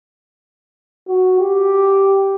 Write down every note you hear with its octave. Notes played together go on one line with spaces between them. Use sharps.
F#4
G4